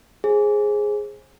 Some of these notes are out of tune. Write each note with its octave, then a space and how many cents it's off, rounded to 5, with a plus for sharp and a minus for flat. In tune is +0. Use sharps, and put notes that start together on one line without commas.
G#4 +0 C5 +30